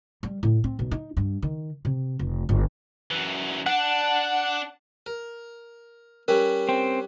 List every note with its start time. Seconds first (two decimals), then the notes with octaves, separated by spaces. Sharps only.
0.23 G3
0.43 A2
0.64 C4
0.79 B1
0.91 D#4
1.17 G2
1.42 D#3
1.85 C3
2.19 F1
2.49 G1
3.11 F#2 E3
3.66 D4 F#5
5.06 A#4
6.28 G3 C#4 A#4 B4
6.69 C4